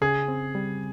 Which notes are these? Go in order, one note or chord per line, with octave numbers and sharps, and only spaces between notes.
C#3 G#4
C4
G3